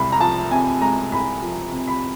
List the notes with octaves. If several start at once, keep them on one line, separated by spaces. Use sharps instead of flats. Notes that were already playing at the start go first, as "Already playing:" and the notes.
Already playing: C2 G#3 B5
A#5
F3 A5
C3 G#5
G#3 A#5
C2 B5
F3
C3
B5